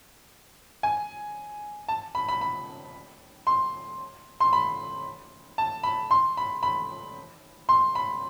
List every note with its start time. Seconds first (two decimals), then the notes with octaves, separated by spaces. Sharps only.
0.83 G#5
1.88 A5
2.15 B5
2.28 B5
2.41 B5
3.47 C6
4.40 C6
4.53 B5
5.58 A5
5.83 B5
6.11 C6
6.37 B5
6.63 B5
7.69 C6
7.95 B5